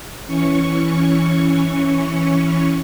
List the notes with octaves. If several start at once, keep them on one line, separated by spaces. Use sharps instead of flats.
E3 C#4 C#6